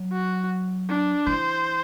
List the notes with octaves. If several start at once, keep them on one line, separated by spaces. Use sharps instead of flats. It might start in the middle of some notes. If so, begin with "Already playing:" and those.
Already playing: F#3
F#4
D4
E3 C5